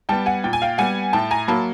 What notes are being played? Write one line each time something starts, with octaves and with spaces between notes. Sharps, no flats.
G3 B3 G5 A5
F#5 G#5
A#2 G5
G#5
F5 G5
G3 B3 F#5 G#5
A2 G5 A5
G#5 A#5
F#3 A#3 A5 B5